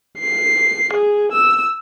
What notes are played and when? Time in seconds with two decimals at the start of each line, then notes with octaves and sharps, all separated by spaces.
0.20 C7
0.93 G#4
1.32 E6